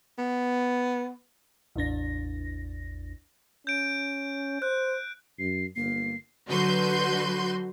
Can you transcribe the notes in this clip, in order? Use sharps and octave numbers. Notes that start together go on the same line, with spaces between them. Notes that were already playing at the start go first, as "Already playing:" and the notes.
B3
A1 E2 D4 A#6
C#4 G6 D7
C5 F#6
F#2 C7
G1 A#3 C7
D3 F#3 F#4 B4 C6 G6